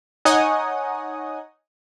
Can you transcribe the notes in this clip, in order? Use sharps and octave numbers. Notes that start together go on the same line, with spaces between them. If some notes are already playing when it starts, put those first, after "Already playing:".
D#4 C#5 D#5 F#5 G#5 D#6